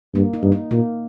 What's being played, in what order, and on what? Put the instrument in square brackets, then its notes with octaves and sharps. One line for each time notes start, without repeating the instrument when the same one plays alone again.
[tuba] G2 [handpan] A#3
[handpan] D#4
[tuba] G2
[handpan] D#4
[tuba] A#2 [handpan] A#3